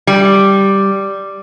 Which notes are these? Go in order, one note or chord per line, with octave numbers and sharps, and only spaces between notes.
G3